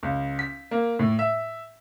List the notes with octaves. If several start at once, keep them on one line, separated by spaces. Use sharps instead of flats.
C#2
B6
A#3
A2
E5